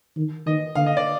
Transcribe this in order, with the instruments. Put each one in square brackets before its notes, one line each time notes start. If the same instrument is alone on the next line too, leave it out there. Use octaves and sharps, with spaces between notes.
[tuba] D#3
[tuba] D#3 [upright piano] D#5
[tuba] D3 [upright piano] F5
[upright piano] D#5
D5